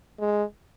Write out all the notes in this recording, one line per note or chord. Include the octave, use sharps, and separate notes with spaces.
G#3